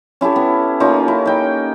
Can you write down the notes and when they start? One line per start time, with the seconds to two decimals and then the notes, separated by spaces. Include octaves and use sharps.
0.21 C#4 E4 G4 A4
0.36 B3
0.80 A#3 C#4 D#4 F4
1.08 E4
1.26 D#4 G5